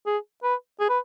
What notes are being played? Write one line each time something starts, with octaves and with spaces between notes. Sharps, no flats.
G#4
B4
G#4
B4